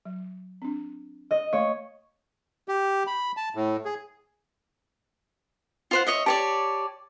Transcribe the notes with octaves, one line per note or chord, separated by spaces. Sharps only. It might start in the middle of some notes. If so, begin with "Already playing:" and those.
F#3
C4 D4
D#5
A3 A#3 C#5 F5
G4
B5
A5
A2
G#4
F4 C5 F#5
C#5 D#5 E5
G4 C#5 D5 A5